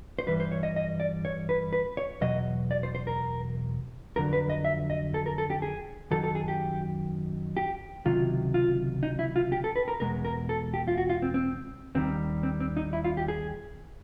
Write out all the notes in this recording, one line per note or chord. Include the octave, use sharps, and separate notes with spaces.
C5
G2 E3 G3 B4
C5
C#5
D#5
D#5
D5
C#5
B4
B4
C#5
E2 B2 F#3 D#5
D5
C5
C5
A#4
F2 D3 F#3 A#4
B4
D#5
E5
D#5
A4
A#4
A4
G4
G#4
F#2 D#3 F#3 A4
A4
G#4
G4
G4
C#2 C3 D#3 F#3 F4
F4
D#4
E4
F4
G4
A4
B4
A#4
E2 B2 G#3 A#4
A#4
A4
G4
F4
F#4
F4
C4
C4
D#2 D#3 G3 C4
C4
C4
D#4
E4
F4
G4
G#4